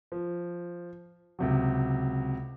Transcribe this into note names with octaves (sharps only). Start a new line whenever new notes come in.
F3
C#2 C3 F#3